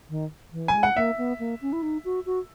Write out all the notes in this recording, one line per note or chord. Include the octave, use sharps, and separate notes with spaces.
D#3
E3
F#3 G#5
G#3
F#5
A#3 E5
B3
A#3
C#4
E4
D#4
F#4
F#4